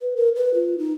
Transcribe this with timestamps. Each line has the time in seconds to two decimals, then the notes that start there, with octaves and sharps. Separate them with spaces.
0.01 B4
0.16 A#4
0.36 B4
0.54 F4
0.78 D#4